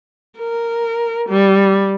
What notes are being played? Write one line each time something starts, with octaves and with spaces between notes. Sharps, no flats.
A#4
G3